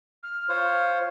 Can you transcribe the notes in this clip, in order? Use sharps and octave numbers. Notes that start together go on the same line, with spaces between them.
F6
F4 C5 C#5